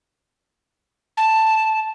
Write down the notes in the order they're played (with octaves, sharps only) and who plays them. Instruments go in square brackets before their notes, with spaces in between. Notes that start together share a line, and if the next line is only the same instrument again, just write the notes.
[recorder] A5